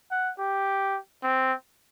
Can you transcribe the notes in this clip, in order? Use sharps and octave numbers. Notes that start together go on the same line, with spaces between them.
F#5
G4
C4